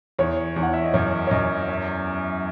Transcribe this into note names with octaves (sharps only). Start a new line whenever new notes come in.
E2 C#5
E2
F#5
E5
D#5
F#2 C#5
C#5
F#2 D#5
E5